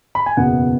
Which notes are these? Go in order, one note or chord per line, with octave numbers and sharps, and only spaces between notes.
B5
G#5
F#1 E2 B2 B3 F#5